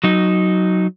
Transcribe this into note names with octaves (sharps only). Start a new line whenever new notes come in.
F#3 D#4